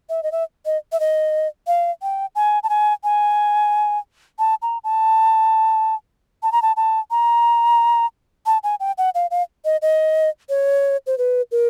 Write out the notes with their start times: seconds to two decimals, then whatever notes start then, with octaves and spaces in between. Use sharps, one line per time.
0.10 E5
0.23 D#5
0.32 E5
0.66 D#5
0.92 E5
1.00 D#5
1.67 F5
2.02 G5
2.35 G#5
2.63 A5
2.69 G#5
3.04 G#5
4.39 A5
4.62 A#5
4.84 A5
6.43 A5
6.52 A#5
6.62 A5
6.77 A5
7.11 A#5
8.46 A5
8.63 G#5
8.80 G5
8.98 F#5
9.15 F5
9.31 F5
9.65 D#5
9.82 D#5
10.49 C#5
11.07 C5
11.18 B4
11.52 A#4